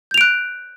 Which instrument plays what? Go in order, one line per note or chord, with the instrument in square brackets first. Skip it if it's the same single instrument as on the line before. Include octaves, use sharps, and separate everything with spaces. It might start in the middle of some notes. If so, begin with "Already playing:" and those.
[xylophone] G6
F7
D7
F#6